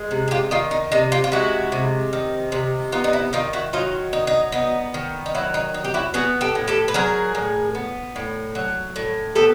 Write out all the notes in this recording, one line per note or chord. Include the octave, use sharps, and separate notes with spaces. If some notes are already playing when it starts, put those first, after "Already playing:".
Already playing: G#3
C3
G#4
F4 G4
D#3 D#4 F4
D#4
C3 D#4
F4 G4
F4
G#3 E4 F#4
C3
D#3
C3
B3 D#4 F4
D#4
E4
D#3 D#4 F4
E4 F#4
F#3 D#4 F4
D#4
D#4
B3 D#4
D#3
D#4
F#3 E4
D#4
D#4
G4
E4 F#4
B3 F#4 G#4
G4 A4
A2
G4 A4
B4
F#3 G#4 A#4
A2
B3
A2
F#3
A2
B3 G4 A4